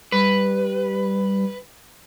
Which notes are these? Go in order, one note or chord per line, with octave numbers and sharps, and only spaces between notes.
G3 B4